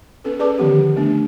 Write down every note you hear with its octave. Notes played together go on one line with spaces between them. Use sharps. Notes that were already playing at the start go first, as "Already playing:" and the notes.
B3 C#4 A4 B4
G#4 B4 D5 A5 D6
D3 D#3 F3 B3 G4
A3 B3 D4